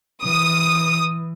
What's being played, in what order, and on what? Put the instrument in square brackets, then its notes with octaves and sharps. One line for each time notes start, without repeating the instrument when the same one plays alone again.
[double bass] E3 [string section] D#6